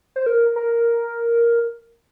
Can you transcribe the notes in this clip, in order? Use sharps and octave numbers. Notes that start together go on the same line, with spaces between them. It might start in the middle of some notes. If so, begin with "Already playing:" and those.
C5
A#4
A#4